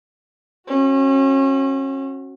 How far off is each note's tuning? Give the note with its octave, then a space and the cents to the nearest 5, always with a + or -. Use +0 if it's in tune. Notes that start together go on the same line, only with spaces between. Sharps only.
C#4 -35 F#4 +0